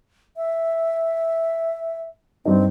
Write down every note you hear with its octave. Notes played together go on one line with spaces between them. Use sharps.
E5
G2 C4 D#4